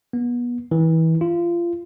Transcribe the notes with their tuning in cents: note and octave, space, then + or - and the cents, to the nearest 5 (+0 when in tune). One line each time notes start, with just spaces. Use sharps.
B3 -30
E3 -30
F4 -25